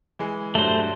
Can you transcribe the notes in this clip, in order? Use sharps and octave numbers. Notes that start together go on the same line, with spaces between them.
E3 G#3
E1 G2 F#3 A3 C5